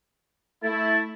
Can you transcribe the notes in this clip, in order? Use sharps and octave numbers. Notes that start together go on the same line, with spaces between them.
A3 E4 A6